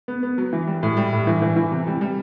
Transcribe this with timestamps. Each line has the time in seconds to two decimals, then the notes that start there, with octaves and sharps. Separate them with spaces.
0.08 B3
0.23 B3
0.38 F#3
0.53 E3
0.68 G3
0.83 A2
0.97 G3
1.13 A2
1.27 E3
1.42 E3
1.56 E3
1.72 C3
1.87 G3
2.01 G3